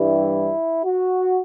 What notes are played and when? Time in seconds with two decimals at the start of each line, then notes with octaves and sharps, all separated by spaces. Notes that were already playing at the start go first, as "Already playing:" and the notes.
Already playing: G2 E3 G3 E4
0.84 F#4